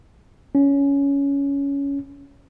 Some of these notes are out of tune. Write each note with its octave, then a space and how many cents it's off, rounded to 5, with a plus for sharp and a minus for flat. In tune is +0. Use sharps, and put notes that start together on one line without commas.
C#4 +15